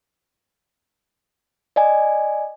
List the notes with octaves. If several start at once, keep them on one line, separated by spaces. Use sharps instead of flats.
D5 D#5 G#5